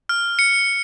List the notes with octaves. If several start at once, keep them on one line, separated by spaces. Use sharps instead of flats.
F6
C#7